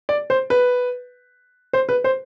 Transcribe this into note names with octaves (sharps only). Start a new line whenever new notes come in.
D5
C5
B4
C5
B4
C5